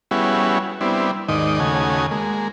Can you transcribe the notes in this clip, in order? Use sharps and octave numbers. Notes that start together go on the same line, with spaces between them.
G3 B3 C#4 E4 F#4 G#4
G3 B3 C4 D4 E4
D#2 G#2 D#3 D#4 D5 D#5
D#2 C#3 A3 F#4 G#5 D#6
G#3 A#3